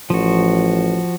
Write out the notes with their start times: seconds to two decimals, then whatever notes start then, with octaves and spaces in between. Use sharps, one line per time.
0.10 A1 F3 F#4